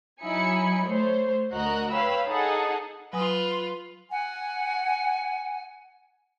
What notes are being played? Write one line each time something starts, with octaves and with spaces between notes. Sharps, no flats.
F#3 D#4 E4 G#5 B5 C#7
A3 C5 C#5
D2 F#4 A#4 D#5 A#5 F#6
B4 C#5 F5 G5 B5 E6
D#4 G#4 A4 F#5 A5
F#3 F4 B4 G#5 D#6
F#5 G#5